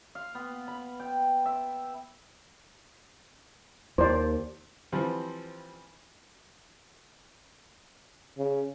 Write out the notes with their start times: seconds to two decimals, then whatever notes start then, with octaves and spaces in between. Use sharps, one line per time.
0.15 F5
0.35 B3
0.68 B5
1.00 G5
1.45 E5
3.98 D#2 C5 D5
4.92 E3 F3 G3 C4
8.38 C#3